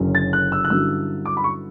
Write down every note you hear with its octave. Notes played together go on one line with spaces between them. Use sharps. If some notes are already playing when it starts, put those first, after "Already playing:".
Already playing: F#1 F#2 D3 F#3 C#4
A6
F#6
E6
F#6
G2 D3 F#3 C#4 E4 E6
D6
B5
C#6